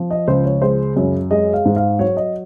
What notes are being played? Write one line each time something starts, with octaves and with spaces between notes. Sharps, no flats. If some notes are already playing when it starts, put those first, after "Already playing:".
Already playing: F3
D#5
C#2 C5
C#5
G#3 C5
F#2
G#3 D#5
F5
G#2
F5
F#3 C#5
D#5